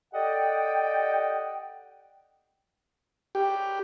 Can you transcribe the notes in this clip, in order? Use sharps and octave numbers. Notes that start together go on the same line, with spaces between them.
G4 A4 D5 D#5 F#5 G5
G4